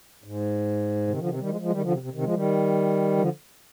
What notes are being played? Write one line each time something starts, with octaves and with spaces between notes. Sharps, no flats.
G#2
C3 D#3
D3 F3
C3 D#3
D#3 G3
F3 G#3
F3 G#3
D#3 G3
D3 F3
C3
C3
C3 D#3
F3 G#3
D#3 G3
D3 F3